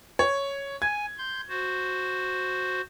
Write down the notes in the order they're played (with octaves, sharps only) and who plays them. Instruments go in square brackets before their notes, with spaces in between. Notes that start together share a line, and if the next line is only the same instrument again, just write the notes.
[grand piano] C#5
[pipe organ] G#5 [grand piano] G#6
[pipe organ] C6 G6
F#4 C5